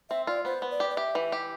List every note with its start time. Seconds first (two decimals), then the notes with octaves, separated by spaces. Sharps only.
0.10 C4 E5
0.27 F4 D5
0.45 B3 C5
0.62 B3
0.71 D5
0.80 G4
0.90 D5
0.97 G4 E5
1.15 E3
1.32 G4